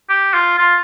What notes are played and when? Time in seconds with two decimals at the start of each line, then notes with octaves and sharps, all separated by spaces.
0.09 G4
0.34 F4
0.58 F4